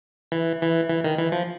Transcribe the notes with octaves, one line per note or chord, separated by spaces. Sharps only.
E3
E3
E3
D#3
E3
F3